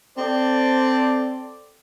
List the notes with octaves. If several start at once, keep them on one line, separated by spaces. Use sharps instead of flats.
C4 A4 C5 D5